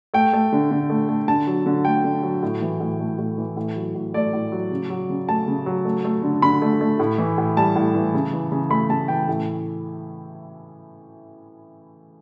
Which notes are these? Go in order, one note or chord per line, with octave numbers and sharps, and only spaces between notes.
A3 G5
A3
D3
D3
A3
A3
D3 A5
F#3
D3
A3 G5
D3
F#3
A2
E3
A2
A3
A2
E3
A2
F#3
A2
A3 D5
A2
F#3
C#3
F#3
C#3
A3 A5
C#3
F#3
A3
A3
D3
D3 B5
A3
A3
A2
E3
A2
G3 A5
A2
E3
C#3
E3
C#3
A3 B5
C#3 A5
E3 G5
A2